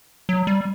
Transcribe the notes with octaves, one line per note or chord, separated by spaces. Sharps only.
F#3
G3